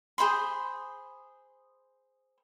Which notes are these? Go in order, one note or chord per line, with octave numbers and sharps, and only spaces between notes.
G#4 C5 B5 C6